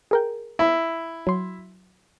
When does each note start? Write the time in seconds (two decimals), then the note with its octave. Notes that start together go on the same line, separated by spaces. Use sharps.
0.11 G#4 A#4 G5
0.59 E4
1.27 F#3 C6